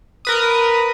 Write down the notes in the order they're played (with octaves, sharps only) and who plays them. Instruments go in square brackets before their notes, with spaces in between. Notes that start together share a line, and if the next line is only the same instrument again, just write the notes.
[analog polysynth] A#4 B4 D#6